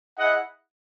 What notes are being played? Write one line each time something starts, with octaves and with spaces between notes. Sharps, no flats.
E4 G#4 D#5 F#5